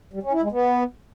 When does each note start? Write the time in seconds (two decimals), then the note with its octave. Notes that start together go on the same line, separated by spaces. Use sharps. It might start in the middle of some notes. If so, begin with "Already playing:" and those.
0.13 G3
0.23 C#4
0.33 E4
0.42 G#3
0.52 B3